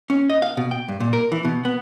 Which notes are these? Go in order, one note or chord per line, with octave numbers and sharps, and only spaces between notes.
C#4
D#5
F5
B2
G5
G2
A#2
A#4
E3
B2
B3